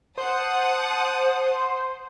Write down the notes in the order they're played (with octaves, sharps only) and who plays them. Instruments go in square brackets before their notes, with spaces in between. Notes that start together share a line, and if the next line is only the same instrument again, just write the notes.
[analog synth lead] C5 [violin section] F#5 A5 D#6